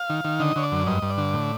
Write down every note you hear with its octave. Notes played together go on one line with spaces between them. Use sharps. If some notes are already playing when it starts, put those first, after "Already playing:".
Already playing: F5
D#3
D#3
D3 D#5
D3 C#5
D5
F#2
G2 D#5
G2
D5
D3
A2